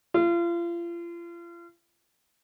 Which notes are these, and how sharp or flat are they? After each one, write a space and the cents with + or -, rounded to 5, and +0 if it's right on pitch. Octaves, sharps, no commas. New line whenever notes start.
F4 -35